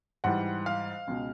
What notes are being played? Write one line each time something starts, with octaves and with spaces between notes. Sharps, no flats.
G#2 E3 G3 F#5
F5
C#2 B2 G#3